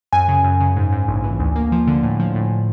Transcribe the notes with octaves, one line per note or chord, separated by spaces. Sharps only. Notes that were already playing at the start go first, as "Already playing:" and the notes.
F#2 G#5
C#3
F#2
C#3
G#2
G#2
A#1
E3
D2
A#3
F3
D3
A2
F3
A2